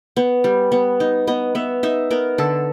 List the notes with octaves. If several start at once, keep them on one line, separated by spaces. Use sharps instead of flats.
B3
G3
B3
D#4
B3 D#5
B3 E5
D#4 E5
B3 A#4
D3 A4